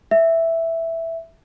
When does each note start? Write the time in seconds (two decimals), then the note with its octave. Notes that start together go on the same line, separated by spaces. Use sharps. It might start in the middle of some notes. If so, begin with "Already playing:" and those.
0.11 E5